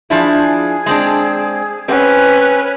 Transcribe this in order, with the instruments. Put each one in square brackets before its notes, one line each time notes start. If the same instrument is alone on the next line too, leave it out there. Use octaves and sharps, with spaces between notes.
[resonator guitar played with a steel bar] F3 D4 E4 [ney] G#4
[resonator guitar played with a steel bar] G#3 C4 D4
[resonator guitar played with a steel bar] C4 [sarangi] C#4 [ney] B4